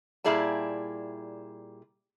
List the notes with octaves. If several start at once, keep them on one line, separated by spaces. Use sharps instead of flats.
A#2 G3 E4 G#4 D5 A5